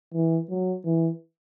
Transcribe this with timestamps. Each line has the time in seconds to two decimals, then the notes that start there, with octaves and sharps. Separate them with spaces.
0.14 E3
0.50 F#3
0.85 E3